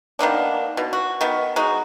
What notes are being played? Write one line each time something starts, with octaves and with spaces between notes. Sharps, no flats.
D#3 A#3 B3 D4
B2
F#4
D#3 B3
G#3 D#4 F#4